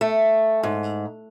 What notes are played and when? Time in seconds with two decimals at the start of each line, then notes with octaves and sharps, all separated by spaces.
0.01 A3
0.63 G#2